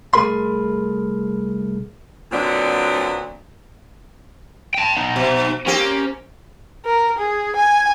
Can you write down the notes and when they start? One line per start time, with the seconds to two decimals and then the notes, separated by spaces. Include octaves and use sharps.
0.14 C2 A3 G#4 A#4 B5 C6
2.32 A#2 D3 F#3 B3 C4 D4
4.74 G5 A5
4.96 B3 D#4
5.16 B2
5.67 A#3 C4 C#4 G4
6.85 A#4
7.18 G#4
7.56 G#5